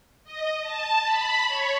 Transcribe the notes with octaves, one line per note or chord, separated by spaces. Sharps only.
D#5
A5
B5
C#5